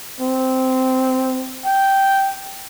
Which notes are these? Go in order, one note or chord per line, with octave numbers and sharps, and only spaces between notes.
C4
G5